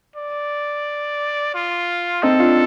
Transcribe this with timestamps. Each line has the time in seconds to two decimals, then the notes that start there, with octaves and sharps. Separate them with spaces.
0.16 D5
1.54 F4
2.23 C4 D#4 A4
2.39 D4 F4